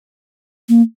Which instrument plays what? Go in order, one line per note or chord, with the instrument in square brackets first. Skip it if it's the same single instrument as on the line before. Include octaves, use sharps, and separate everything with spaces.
[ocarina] A#3